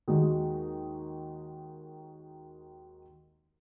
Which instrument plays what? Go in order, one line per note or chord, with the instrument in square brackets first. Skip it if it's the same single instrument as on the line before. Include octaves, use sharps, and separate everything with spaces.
[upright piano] D#2 D#3 G#3 D#4 F#4